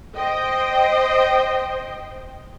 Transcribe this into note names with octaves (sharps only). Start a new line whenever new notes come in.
C5 D#5 G5